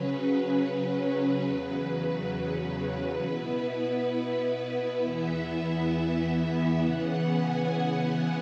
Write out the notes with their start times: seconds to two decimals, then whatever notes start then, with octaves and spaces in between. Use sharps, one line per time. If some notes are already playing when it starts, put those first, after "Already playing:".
Already playing: C#3 F#3 C#4 B4
1.43 E2 C#3 F#3 B4
3.22 B2 B3 E4 B4
5.02 E2 E3 B3 E4 E5
6.81 C#3 E3 B3 F#5
7.26 G#5
7.71 G#5